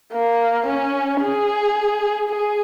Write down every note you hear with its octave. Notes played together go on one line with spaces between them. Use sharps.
A#3
C#4
G#4
G#4